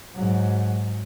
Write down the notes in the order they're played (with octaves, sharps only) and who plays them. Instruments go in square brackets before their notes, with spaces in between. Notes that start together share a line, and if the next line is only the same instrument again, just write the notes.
[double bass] G#2 F#3